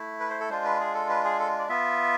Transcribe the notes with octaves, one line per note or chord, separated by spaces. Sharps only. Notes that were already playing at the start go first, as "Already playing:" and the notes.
Already playing: A3 E4
B4
C5
A4
G#3 D4 F4 C5
B4
G#4
A4
B4
G#4
A4
D5
B3 F4 E5